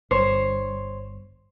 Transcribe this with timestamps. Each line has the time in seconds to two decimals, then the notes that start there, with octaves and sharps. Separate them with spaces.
0.11 G1 C5 C#5